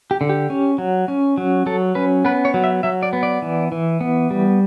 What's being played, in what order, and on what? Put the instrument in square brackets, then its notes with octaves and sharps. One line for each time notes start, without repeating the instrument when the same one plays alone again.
[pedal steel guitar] G4
D3
G4
C#4
F#3
C#4
F#3
F#3 A4
C#4 B4
B3 B4
C#5
F#3
E5
F#3 E5
D5
B3
D5
E3
E3
B3
G3